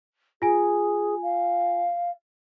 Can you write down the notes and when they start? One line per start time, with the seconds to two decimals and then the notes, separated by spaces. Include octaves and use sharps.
0.42 F4 G#4 G#5
1.22 F5